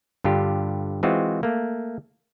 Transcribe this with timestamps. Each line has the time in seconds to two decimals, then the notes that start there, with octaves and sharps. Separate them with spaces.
0.24 G2 D3 F4 G4
1.03 E3 G#3 C4 F4 F#4
1.43 A3 A#3